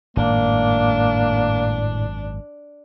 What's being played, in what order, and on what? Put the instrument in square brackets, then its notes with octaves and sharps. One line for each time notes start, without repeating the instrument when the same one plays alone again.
[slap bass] G#1 F#2 [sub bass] A2 [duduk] A#3 [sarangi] D4